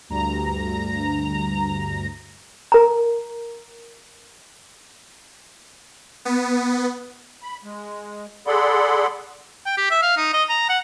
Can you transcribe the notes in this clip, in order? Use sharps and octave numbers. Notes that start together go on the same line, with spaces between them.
D2 G2 A#5
A#4 A#5
B3
B5
G#3
G#4 A4 D5 F#5 B5 C6
G5
G4
E5
F5
D#4
D#5
A#5
F#5